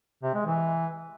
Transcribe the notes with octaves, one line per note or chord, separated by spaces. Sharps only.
C3
G#3
E3